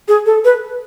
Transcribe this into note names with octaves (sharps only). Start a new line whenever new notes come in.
G#4
A4
B4